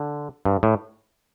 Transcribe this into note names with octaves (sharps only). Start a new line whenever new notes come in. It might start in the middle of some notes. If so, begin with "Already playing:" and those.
Already playing: D3
G2
A2